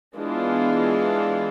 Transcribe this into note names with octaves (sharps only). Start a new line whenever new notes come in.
E3 G#3 B3 D4 F4